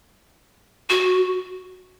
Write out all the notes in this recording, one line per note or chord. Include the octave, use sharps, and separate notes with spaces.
F#4